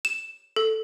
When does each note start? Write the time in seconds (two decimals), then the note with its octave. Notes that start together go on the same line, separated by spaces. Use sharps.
0.05 E7
0.56 A4